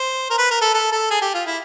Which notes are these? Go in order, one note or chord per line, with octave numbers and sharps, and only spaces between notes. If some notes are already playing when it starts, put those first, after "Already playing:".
Already playing: C5
A#4
B4
A#4
A4
A4
A4
G#4
G4
F4
E4